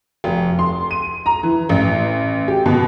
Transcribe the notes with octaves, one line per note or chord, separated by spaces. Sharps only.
F1
C6
D#7
A#5
E3
A1
G4
B2